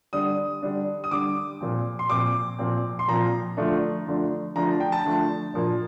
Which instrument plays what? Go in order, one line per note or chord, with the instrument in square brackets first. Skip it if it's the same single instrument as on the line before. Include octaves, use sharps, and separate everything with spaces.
[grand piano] D3 G3 D4 D#6
D3 G3 D4
D#6
D3 G3 D4 D6
A#2 F3 C4
C6
A#2 F3 C4 D6
A#2 F3 C4
C6
A#2 F3 C4 A#5
D3 F3 A3 D4
D3 F3 A3 D4
D3 F3 A3 D4 A#5
A5
G5
A5
D3 F3 A3 D4
A#2 F3 A#3 D4